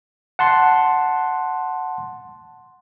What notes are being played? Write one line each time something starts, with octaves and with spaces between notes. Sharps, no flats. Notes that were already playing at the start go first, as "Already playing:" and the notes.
F#5 A5 C6